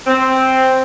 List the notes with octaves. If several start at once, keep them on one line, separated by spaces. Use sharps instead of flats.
C4